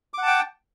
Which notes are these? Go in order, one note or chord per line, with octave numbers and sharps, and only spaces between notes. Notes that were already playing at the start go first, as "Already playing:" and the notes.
F#5 G5 A5 D6